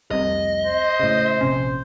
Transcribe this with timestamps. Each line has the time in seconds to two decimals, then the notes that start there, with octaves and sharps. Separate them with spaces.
0.11 F1 C2 C3 D#5
0.64 C5
1.00 A2 C#3
1.41 A#1 C3 C#4